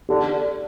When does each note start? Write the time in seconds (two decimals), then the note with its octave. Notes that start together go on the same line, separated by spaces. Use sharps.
0.09 D3 G4